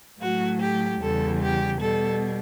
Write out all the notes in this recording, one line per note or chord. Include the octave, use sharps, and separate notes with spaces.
A2 F#3 A3 F#4
G4
E2 C#3 G3 A4
G4
B2 G3 A4